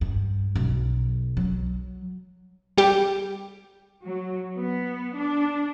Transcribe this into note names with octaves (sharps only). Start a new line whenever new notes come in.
G2
B1
F#3
G3 G4
F#3
B3
D4